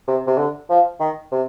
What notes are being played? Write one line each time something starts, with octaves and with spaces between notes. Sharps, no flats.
C3
C3
D3
F3
D#3
C3